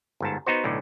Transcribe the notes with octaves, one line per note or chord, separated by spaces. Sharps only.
G1 G#2 A5
B3 D#4 F#4 C5
B1 A2 D3